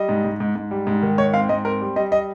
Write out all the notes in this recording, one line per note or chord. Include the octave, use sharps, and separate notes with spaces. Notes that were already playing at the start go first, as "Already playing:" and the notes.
Already playing: G3 D#5
G#2
G#2
G#2
G#2
G3
G#2
D#3
G#2 C#5
C4 F5
G#2 D#5
C4 A#4
G3
G3 D#5
D#5